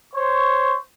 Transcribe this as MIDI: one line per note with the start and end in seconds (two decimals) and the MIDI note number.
0.14 0.75 72
0.14 0.75 73
0.14 0.75 85